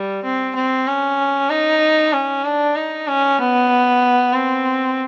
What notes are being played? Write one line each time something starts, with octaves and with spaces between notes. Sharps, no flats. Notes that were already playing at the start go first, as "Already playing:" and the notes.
Already playing: G3
C4
C4
C#4
D#4
C#4
D4
D#4
C#4
B3
C4